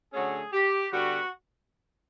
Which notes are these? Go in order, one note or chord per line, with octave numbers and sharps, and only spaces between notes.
D3 F#3 A3 C#4 G#4
G4
D3 G3 B3 F#4